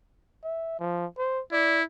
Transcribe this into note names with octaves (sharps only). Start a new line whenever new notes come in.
E5
F3
C5
E4 D5